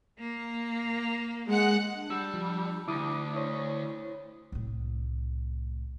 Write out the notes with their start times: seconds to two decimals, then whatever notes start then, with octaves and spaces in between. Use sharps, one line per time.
0.20 A#3
1.48 G#3 F#5
1.95 D4
2.11 G3 E6
2.34 F3
2.88 D2 E4 D6 D#6
3.36 E4 C5 C#5 D#6
4.52 C2 A2